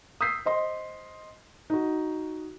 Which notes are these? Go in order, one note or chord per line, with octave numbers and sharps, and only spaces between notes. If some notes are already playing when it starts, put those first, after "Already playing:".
D#6 E6 G6 B6 C7
C5 D#5 C6
D#4 F#4